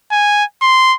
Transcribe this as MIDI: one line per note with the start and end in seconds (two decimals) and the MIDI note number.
0.11 0.44 80
0.62 0.95 84